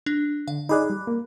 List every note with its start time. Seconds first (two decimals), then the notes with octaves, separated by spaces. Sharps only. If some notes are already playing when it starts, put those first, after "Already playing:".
0.06 D4
0.48 D3 F5
0.69 D#4 G#4 D5 B5 D6 F#6
0.90 G3
1.07 A#3